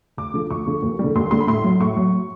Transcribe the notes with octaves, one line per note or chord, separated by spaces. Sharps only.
D2 D6
D3 F3
D2 C#6
D3 F3
D#2
G3
D3
D#2 C6
D3 G3 C6
B5
A2 C6
F#3
A2 C#6
F#3